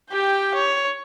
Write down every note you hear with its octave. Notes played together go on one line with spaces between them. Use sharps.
G4 G5
C#5